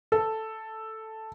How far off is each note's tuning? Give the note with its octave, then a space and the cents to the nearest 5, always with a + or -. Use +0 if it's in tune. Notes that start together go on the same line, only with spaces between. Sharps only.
A4 +0